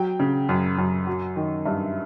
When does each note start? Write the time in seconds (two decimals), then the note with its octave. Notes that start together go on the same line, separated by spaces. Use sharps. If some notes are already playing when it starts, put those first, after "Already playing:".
Already playing: F#3 G5
0.20 C#3
0.49 F#2
0.78 F#2
1.07 F#3
1.36 D#3
1.65 G2 E5